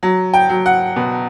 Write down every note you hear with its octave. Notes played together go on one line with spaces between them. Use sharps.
F#3
G5
F#3
F#5
B2